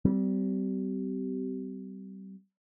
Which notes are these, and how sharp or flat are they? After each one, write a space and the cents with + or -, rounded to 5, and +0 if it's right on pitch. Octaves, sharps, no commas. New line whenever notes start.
G3 -25 C4 -30